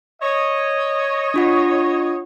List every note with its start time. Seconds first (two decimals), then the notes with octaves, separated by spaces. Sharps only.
0.22 C#5 D#5
1.34 D4 F4 F#5